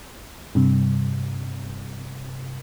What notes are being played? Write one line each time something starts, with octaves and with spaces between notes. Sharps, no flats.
G2 C3